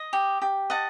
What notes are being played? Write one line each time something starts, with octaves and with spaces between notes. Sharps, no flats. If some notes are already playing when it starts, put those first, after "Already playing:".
Already playing: D#5
G4
G4
D#5 F#5 A5